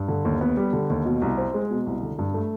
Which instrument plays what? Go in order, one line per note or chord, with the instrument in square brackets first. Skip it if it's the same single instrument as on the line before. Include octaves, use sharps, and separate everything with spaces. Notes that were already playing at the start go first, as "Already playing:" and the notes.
Already playing: [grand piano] G2
D3
D#2
B3
G3
D3
D#2
B2
C2
C4
G#3
B2
C2
D3
G2
A3